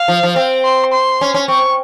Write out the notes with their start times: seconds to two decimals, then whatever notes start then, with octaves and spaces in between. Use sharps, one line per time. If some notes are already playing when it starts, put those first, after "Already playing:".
Already playing: F5
0.08 F3
0.23 F3
0.36 C4
0.65 C6
0.93 C6
1.21 C#4
1.34 C#4
1.48 C4 C#6